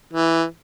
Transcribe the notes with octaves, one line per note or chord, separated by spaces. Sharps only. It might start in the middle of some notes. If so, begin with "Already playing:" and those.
E3